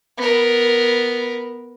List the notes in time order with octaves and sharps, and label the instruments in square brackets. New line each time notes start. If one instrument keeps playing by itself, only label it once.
[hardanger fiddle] B3 A#4